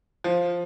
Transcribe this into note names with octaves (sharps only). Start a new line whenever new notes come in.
F3